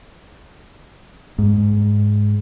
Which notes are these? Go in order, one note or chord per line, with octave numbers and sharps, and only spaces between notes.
G#2